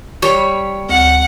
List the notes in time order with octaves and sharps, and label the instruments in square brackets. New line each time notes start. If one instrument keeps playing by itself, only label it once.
[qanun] G3 B5 [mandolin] C#5
[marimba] D2 [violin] F#5